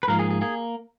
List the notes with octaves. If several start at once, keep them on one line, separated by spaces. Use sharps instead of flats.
B4
G#2 F3 A#3 A#4
G#4
G#4
A#3 G#4